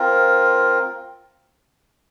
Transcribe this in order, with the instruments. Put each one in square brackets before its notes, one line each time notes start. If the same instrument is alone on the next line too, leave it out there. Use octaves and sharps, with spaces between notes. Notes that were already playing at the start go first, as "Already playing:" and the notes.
Already playing: [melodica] C4 F4 A#4